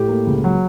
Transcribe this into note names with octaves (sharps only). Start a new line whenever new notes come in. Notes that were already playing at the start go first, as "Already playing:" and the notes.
Already playing: A2 G4
A#3
C#2
F#3